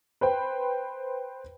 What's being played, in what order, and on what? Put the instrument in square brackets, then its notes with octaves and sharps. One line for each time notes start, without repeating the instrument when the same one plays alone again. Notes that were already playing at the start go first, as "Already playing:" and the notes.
[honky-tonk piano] B4 C5 G5